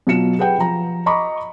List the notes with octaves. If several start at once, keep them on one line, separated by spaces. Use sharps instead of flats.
B2 F#3 F4 C#7 E7
G4 G#4 B4 F#5 G5
F3 A#5
D#5 A#5 B5 C#6 D6